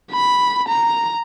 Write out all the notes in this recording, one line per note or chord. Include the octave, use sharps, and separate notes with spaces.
B5
A#5